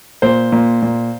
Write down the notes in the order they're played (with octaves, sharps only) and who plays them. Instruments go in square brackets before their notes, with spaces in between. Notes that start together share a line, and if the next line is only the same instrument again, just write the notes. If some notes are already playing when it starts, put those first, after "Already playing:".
[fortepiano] A#2 C5
A#2
A#2